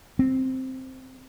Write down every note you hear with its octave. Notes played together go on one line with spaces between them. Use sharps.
C4